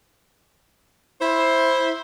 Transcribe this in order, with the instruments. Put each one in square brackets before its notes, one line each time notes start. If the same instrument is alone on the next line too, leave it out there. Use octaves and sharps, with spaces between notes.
[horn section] E4 C5